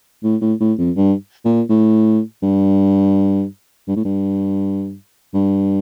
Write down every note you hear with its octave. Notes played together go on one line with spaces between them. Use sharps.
A2
A2
A2
F2
G2
A#2
A2
G2
G2
A2
G2
G2